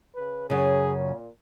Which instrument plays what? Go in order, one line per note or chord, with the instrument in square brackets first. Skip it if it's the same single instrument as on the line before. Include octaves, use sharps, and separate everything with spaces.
[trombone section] C#3 B4
[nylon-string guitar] F#2 C#3 [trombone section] G#4
[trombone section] A#2